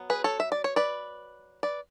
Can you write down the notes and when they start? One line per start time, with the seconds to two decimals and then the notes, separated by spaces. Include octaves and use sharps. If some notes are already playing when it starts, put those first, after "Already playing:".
Already playing: F#3 B3
0.10 G#4 B4
0.24 A4 C#5
0.40 E5
0.52 D5
0.64 C#5
0.76 B4 D5
1.63 B4 D5